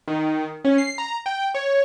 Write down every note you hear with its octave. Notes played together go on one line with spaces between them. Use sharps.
D#3
C#4
C7
A#5
G5
C#5